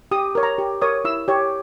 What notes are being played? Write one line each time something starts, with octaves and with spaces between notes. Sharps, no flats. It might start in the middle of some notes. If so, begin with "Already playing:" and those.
G4 D#6
A#4 C#5
A#5
G4
A#4 C#5 D#6
E4 E6
G4 C#5